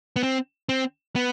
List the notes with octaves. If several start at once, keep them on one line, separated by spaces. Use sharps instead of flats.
B3
C4
C4
B3